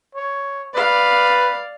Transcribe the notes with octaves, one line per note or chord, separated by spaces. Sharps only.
C#5
B4 D5 F5